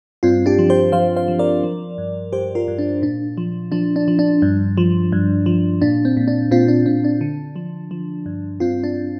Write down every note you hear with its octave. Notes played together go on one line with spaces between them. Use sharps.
G2 C4 F4
D4 G4
F3
G4 C5
F3 C5 F5
C5 F5
F3
A#4 D5
F3
G2
G2 G4 C5
F4 A#4
G2
D4
A#2 D4
F3
F3 D4
D4
F3
D4
G2
F3
G2
F3
A#2 D4
C4
A#2
D4
A#2 C4 F4
D4
A#2 C4
D4
D3
F3
F3
G2
G2 C4 F4
D4